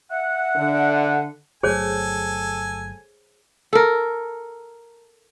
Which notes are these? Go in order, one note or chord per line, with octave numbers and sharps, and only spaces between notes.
E5 F#5
D3
G1 F#3 A3 G#4 A4 C5 C#5 G#5
A4 A#4